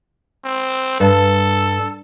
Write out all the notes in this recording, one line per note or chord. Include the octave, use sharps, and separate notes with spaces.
C4
G2 A4